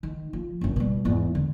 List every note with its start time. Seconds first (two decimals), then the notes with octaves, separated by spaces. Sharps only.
0.03 D#3
0.33 F3
0.61 G1 F#2
0.76 B2 G3
1.05 E2 G#2
1.35 D3